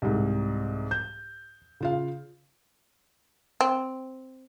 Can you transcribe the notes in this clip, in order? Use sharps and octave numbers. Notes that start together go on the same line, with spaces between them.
C2 G#2
G6
C#3 F4 F5
C4